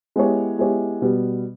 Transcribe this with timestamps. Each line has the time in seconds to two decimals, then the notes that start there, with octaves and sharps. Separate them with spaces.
0.16 G#3 B3 E4 G4 C#5
0.59 G#3 B3 E4 G4 C#5
1.02 B2 G3 B3